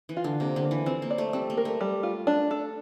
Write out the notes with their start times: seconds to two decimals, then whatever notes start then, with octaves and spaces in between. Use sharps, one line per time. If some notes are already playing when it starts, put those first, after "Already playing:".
0.09 E3
0.17 F4
0.24 D3
0.40 C3 A#3
0.56 D3
0.64 A#3
0.71 E3
0.86 F3 C4
1.02 A#3
1.11 D5
1.18 A3
1.33 G3 C4
1.50 A#3
1.57 A#4
1.65 A3
1.81 G3
2.03 F4
2.27 D4
2.51 A4